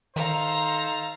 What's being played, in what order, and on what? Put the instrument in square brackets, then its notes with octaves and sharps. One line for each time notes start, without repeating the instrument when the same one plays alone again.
[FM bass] D#3 [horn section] D#4 A4 C5 [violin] F5 F6 [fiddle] A#5